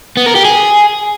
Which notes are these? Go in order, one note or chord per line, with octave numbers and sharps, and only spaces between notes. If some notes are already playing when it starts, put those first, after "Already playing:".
B3
A#4
G4
G#4